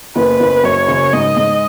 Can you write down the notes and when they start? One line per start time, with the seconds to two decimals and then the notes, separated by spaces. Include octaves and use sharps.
0.16 F#1 B4
0.40 F#1
0.64 F#2 C#5
0.88 C#3
1.13 G#2 D#5
1.37 G#2